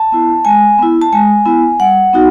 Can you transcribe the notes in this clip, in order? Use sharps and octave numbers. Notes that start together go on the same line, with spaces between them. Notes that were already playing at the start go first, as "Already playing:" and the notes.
Already playing: A5
B3 E4
G#3 G#5
B3 E4
A5
G#3 G#5
B3 E4
G3 F#5
B3 D#4 F#4